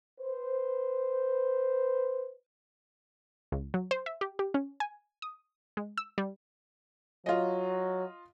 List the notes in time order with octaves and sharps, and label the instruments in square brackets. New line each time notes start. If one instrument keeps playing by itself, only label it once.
[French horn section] B4 C5
[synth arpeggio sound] C#2
F#3
C5
E5
G4
G4
C#4
G#5
D#6
G#3
E6
G3
[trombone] F#3 [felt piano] F4 D#5